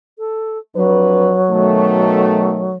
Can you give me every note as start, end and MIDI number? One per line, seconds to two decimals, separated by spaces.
0.19 0.58 69
0.75 1.38 41
0.75 2.76 54
0.75 1.38 62
0.75 1.38 71
1.49 2.69 47
1.49 2.69 51
1.49 2.69 57